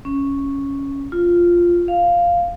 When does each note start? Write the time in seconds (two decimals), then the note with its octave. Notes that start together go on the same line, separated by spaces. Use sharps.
0.05 C#4
1.12 F4
1.88 F5